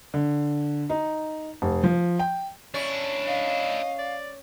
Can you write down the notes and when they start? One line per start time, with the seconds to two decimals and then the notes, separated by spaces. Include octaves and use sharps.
0.14 D3
0.89 D#4
1.62 F1
1.83 F3
2.19 G5
2.74 C#4 D4 E4 C#6
3.27 D#5 F5
3.98 D5